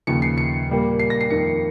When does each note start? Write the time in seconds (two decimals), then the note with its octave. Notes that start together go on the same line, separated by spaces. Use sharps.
0.07 D#2 C#3 F3 C#7
0.22 C7
0.38 C#7
0.68 A#2 G3 A#3
0.99 C7
1.10 A#6
1.21 C7
1.30 F2 D#3 A#3 C#7